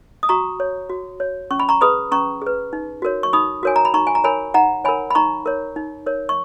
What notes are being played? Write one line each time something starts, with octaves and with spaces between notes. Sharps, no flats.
D#6
F#4 A#5 C#6
C#5
F#4
C#5
C#4 C#6
B5
A#5 C#6
G#4 B4 B5 D#6
C#4 A#5 C#6
G#4 B4
D#4
F#4 A#4 C#5
C#6
D#4 B5 D#6
F#4 A#4 C#5 G#5
A#5
B5
D#4 A#5 C#6
G#5
A#5
A#4 C#5 G#5 B5
D#4 F#5 A#5
A#4 C#5 G#5 B5
B5
D#4 A#5 C#6
A#4 C#5
D#4
A#4 C#5
C#6